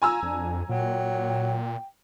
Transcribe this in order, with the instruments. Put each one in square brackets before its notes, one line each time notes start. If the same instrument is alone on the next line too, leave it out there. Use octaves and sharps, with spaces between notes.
[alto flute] F4 [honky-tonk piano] G#5 A#5 E6
[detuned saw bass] F2 [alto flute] D4
[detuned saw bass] A#2 [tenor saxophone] F#3 [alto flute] G5